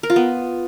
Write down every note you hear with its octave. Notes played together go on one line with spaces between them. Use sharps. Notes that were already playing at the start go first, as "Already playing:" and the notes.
A#4
F4
B3